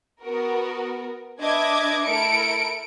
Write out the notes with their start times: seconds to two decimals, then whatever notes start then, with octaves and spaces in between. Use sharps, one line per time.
0.22 B3 F#4 A#4
1.40 D4 B4 D#5 E5 D6 G#6
2.04 A3 E4 A#4 C#7 D7